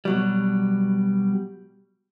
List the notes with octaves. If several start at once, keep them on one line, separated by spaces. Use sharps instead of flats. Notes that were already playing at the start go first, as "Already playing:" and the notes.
B2 F#3 G3